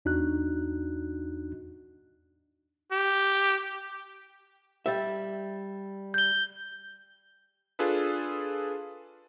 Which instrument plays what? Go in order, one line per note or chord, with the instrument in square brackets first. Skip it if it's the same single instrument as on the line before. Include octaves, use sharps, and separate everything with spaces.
[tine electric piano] E2 D4 D#4 F#4 F#6
[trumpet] G4
[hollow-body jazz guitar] G3 E5
[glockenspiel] G6 G7
[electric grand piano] D4 F4 G#4 A4 B4